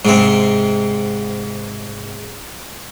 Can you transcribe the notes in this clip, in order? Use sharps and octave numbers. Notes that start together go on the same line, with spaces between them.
G#2 C3 C4